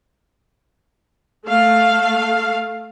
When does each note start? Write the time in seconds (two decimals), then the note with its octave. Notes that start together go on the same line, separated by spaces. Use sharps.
1.47 A3 F5